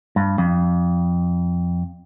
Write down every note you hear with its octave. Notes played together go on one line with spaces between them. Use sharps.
G2
F2